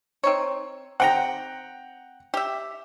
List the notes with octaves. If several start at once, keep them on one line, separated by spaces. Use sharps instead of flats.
C4 D#4 C#5
C4 D#4 F#5 G5 A#5
G4 E5